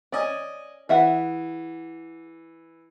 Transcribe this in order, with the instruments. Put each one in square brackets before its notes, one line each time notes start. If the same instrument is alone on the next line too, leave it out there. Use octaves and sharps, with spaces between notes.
[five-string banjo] C#4 [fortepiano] D5 D#5 G#5
[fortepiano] E3 [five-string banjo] G#4 E5 F#5